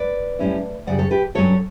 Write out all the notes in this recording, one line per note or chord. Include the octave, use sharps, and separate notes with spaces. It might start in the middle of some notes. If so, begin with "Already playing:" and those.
Already playing: B4 D5
A2 G3 C#4 E4
F#2 C#3 G3 D5 F#5
A4 C#5
G4 B4
G2 F#3 C#4 A4 C#5